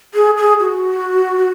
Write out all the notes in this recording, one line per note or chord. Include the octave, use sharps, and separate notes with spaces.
G#4
G#4
F#4